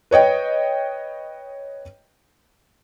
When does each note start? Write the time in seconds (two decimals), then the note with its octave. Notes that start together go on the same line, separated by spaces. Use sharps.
0.11 B4 C#5 D#5 G5